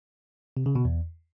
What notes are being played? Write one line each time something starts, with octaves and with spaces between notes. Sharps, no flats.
C3
C#3
B2
E2